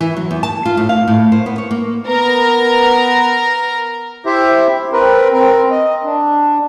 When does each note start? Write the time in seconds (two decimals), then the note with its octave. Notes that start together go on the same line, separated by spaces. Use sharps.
0.01 E3
0.17 F#3
0.31 E2
0.43 A5
0.66 F4
0.77 A2
0.89 F5
1.08 A2
1.32 C5
1.46 B3
1.58 C#5
1.71 A#3
2.07 B3 A#4 B4 A#5
4.26 E4 G4 C5 E5
4.93 C4 A#4 B4
5.33 C4 A#4
5.70 D#5
6.04 D4